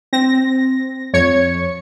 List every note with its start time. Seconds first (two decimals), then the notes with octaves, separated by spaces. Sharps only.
0.13 C4 A#6
1.13 F2 C#5 G#6 C#7